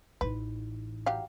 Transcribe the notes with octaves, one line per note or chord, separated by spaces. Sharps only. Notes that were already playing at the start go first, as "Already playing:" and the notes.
A1 D#4 B4
F#3 G4 F5